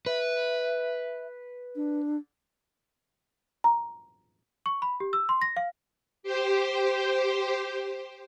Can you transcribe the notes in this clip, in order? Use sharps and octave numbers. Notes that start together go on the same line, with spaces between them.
B4 E5
D4
A#5
C#6
B5
G4
E6
C6
A#6
F5
G4 C5